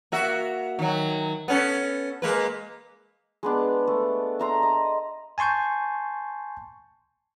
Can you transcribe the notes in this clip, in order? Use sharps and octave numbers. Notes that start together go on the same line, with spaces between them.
A#3 F#4 E5
D#3 F#3
B3 C#4 A4
G#3 A#3 B4
G#3 B3 D4
A3
E5 A#5 C6
D#5
G#5 A5 C6 C#6 G6